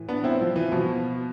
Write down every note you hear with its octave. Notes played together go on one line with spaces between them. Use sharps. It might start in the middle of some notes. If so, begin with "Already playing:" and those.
Already playing: A2 E3
B3 D4
C4 E4
F3
E3
B2 F3